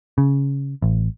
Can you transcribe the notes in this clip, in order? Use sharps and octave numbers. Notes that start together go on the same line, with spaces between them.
C#3
A1